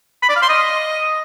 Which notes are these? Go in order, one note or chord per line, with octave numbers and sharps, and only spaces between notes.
B5
D5
F5
C6
D#5